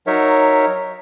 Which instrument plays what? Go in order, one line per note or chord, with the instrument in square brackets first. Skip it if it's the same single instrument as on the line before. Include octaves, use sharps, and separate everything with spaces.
[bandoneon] F#3 D#4 A#4 C#5 E5